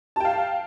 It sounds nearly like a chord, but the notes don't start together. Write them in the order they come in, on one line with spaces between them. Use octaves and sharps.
A5 G5 F5